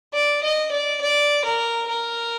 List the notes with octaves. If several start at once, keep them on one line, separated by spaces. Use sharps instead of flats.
D5
D#5
D5
D5
A#4
A#4